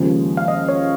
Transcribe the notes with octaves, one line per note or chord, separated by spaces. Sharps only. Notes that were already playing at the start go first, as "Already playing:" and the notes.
Already playing: D#2 C#3 F3 G#3
F5
D#5
C#5